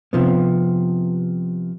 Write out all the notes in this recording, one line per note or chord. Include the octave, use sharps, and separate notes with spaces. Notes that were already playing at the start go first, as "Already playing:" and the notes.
C3 F3 B3